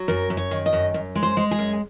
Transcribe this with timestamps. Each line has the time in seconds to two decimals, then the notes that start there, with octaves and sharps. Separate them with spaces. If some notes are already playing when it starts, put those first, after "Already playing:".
Already playing: F#3
0.08 F#2 A#4
0.30 F#2
0.37 C#5
0.51 D#3
0.66 D#5
0.73 F#2
0.94 F#2
1.15 G#3
1.23 C5
1.37 G#3
1.51 G#4
1.59 F#2